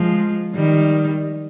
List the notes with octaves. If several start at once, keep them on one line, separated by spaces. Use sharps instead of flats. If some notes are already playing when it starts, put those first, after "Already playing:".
Already playing: F3 G#3
D#3 G3